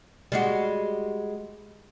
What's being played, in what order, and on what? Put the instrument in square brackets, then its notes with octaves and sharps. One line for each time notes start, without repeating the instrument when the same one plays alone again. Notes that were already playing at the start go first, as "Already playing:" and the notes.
[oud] G3 G#3 F#4